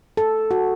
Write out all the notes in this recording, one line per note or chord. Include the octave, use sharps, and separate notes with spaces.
A4
F#4